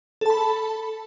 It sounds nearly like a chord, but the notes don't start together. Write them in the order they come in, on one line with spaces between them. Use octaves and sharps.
A4 A5 B5